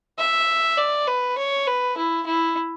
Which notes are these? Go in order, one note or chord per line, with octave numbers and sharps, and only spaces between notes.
E5
D5
B4
C#5
B4
E4
E4